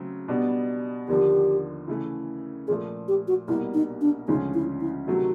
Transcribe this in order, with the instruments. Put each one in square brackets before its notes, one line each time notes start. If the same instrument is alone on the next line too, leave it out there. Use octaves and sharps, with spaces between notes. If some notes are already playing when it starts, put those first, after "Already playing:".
Already playing: [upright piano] C#3 F#3 A3 C4
B2 G3 B3 D4
[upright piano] D#2 D3 F3 [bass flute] G4
[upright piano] C#3 E3 A3
[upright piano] A#2 F3 A3 [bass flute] G#4
[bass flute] G4
F#4
[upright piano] C2 B2 G3 A#3 [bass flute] E4
[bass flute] D#4
D4
[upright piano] D2 C#3 F3 G#3 C#4 [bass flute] D#4
[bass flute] E4
E4
[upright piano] C3 D#3 F#3 A3 [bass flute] F#4